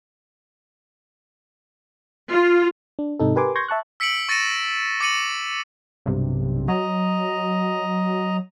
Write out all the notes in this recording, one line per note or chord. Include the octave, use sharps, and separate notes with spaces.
F4
D4
G#2 C3 D#4 A4
G4 A#4 B4 G#5 C6 D6
C6 C#6 G6 G#6 A#6
E5 A5 C#6 F#6
E6 B6 C#7 D7 F#7
C#6 A6 A#6 C#7 D#7 E7
D6 A6 C#7 D#7 F#7
B1 G2 C3
F#3 D#5 A#5